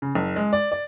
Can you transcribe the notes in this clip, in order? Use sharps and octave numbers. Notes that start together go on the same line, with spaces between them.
C#3
F#1
G#3
D5
D5